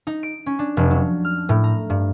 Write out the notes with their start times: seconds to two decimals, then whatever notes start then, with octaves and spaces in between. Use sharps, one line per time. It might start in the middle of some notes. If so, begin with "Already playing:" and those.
0.07 D#4
0.23 D7
0.46 C#4
0.59 D4
0.77 F1
0.91 F#3
1.24 F6
1.49 A2
1.64 A#5
1.90 G2